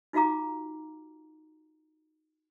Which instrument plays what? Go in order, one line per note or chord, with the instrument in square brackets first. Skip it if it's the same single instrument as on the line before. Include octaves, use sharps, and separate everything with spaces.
[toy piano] D#4 F4 F#4 F5 A#5 D6